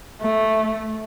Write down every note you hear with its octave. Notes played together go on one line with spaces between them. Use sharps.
A3